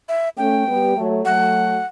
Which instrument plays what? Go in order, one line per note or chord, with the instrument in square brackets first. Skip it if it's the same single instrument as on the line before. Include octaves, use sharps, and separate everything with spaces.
[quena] E5
[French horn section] A3 C#4 [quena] G5
[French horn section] G3 B3
F#3 A3
[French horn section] F#3 A3 [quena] F#5